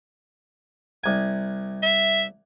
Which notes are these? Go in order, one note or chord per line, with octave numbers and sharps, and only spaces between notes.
C2 G#5
E5